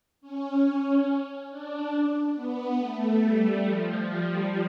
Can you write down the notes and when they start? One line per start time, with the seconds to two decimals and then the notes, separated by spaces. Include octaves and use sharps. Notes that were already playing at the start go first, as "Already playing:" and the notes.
0.21 C#4
1.50 D4
2.35 B3
2.79 A3
3.21 G3
3.64 F3
4.07 G3